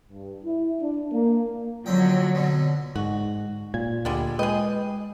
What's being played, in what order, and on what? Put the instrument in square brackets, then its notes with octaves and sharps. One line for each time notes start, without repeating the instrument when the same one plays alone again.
[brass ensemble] G2
E4
D4
A#3
[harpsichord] F2 D3 G5 [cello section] F#3
[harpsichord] B2 D3
[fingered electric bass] G#2 [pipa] F#4
[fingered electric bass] A#2 [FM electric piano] G#6
[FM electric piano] D2 [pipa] D3 G3 G#3
[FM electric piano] G#3 B4 G5 [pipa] G#4 D#5